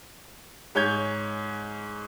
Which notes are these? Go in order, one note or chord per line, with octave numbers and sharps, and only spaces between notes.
G#2 C#5 G6 G#6